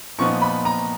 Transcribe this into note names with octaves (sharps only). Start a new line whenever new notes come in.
A#2 F3 B3 D#4 C#6
B5
A#5